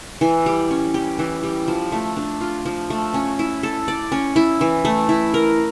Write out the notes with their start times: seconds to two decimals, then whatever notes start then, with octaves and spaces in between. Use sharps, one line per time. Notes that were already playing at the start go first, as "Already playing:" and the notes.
0.21 E3
0.46 G3
0.71 C#4
0.94 G4
1.19 E3
1.43 G3
1.68 F3
1.92 A3
2.17 D4
2.41 F4
2.66 F3
2.90 A3
3.14 C#4
3.39 E4
3.63 A4
3.88 D5
4.12 C#4
4.36 E4
4.61 E3
4.85 A3
5.09 E4
5.34 A#4